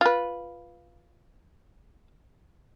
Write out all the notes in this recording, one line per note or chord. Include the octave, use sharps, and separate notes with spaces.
F4 B4